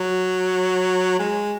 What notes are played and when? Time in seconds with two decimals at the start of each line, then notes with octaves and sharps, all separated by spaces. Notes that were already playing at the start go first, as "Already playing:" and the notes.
Already playing: F#3
1.19 G#3